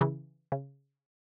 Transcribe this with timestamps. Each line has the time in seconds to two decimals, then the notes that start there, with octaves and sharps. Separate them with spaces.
0.01 C#3 E3
0.52 C#3